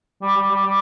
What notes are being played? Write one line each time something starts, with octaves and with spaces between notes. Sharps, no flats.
G3
G3
G3
G3